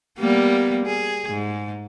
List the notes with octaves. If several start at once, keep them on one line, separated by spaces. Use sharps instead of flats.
G3 A#3 B3
G#4
G#2